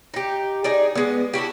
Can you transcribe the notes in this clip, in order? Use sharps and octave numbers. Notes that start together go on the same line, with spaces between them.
D#4 G4
D#4 G#4 D5
G#3 B3
D4 E4 F#4 G4